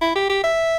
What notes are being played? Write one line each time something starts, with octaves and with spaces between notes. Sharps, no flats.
E4
G4
G4
E5